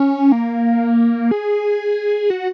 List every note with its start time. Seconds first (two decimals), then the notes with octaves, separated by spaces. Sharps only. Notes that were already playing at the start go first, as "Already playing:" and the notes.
Already playing: C#4
0.32 A#3
1.31 G#4
2.30 F#4